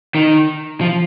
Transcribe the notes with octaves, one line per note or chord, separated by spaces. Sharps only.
D#3
F3